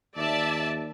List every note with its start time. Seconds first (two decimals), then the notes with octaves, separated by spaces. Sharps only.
0.17 D#2 D5 E5 A5